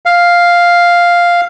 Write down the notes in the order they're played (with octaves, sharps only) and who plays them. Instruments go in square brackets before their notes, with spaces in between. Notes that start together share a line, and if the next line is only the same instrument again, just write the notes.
[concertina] F5